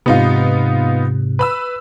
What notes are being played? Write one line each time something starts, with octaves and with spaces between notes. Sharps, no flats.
G#2 C3 B3 D#4 F4
B4 B5 E6